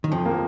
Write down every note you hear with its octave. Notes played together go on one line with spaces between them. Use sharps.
D#3
F2 F3
A#3